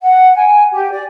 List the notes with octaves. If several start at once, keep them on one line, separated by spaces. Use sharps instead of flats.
F#5
G#5
G4
D5